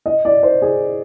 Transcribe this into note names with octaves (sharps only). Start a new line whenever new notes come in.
D#5
D5
C5
G#4